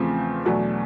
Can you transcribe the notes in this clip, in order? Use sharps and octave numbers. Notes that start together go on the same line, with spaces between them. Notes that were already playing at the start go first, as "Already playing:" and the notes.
Already playing: E2 C#3 F3 A3 C4
E2 B2 F#3 A3 D4